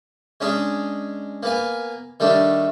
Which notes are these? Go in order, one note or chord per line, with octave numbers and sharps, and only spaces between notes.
G#3 C#4 D4 G#4
A#3 B3 G#5
D#3 G3 A3 D4